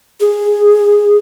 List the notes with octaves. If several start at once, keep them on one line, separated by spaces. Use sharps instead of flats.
G#4